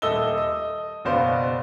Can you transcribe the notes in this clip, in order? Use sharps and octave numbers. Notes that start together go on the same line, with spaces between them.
D#1 A4 D#5 E5 E6 G7
D#5
F#1 B2 B3 C5 D5 F5